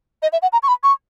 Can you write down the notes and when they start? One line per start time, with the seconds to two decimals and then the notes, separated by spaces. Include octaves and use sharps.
0.22 D#5
0.33 E5
0.42 F#5
0.53 A#5
0.63 C#6
0.68 B5
0.83 C#6